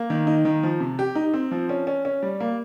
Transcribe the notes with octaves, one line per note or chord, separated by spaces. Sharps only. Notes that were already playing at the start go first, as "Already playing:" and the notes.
Already playing: A#3
D#3
D#4
D#3
F3
C3
G4
D#4
C4
F3
C#4
C#4
C#4
G3
A#3